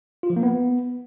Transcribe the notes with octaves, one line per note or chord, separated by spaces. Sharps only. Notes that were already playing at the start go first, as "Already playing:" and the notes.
F4
F3
A#3
B3